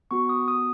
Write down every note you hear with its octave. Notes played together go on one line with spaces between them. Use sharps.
B3 F#4 C#6
D#6
D#6